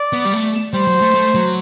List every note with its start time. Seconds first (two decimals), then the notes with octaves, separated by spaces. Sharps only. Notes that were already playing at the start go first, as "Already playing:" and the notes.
Already playing: D5
0.13 B3
0.25 G3
0.33 A3
0.73 G3 C5
0.87 F#3
1.01 A3
1.14 A3
1.35 F#3